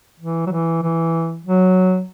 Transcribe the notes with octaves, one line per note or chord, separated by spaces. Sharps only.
E3
F#3
E3
E3
F#3